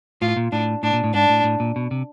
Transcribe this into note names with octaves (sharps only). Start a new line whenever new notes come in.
A2 F4
A#2
A2 D4
A2 D4
A#2
A2
G#2 D4
A2
A2
A#2
B2
C3